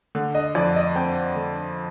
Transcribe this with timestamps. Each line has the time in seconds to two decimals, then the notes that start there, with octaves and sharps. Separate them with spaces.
0.15 D3
0.35 D#5
0.55 F2 D5
0.76 D#5
0.95 C4 G5
1.35 D3